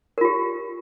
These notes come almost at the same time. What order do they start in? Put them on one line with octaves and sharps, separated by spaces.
A#4 F4 G4